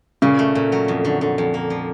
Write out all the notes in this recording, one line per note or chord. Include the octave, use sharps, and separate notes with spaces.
A#2 C#3
A3
A#2
F#3
F2
D3
D3
F2
A#3
F3